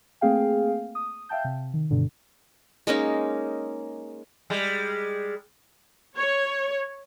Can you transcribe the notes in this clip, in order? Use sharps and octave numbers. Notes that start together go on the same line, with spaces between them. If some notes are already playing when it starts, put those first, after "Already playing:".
A3 A#3 C4 G#4 F5 G5
D#6
E5 F5 G5 A5 G6
C3
D#3
G2 B2 D3
G#3 A#3 C#4 D#4
G3 G#3
C#5